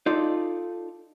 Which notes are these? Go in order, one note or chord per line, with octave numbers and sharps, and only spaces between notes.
D#4 F4 A4 D5